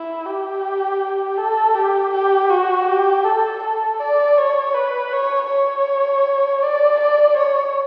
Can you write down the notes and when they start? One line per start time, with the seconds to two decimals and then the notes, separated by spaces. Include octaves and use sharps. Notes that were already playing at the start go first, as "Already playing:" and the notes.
Already playing: E4
0.26 G4
1.38 A4
1.75 G4
2.13 G4
2.50 F#4
2.88 G4
3.25 A4
3.63 A4
3.99 D5
4.38 C#5
4.75 B4
5.13 C#5
5.49 C#5
6.62 D5
7.00 D5
7.37 C#5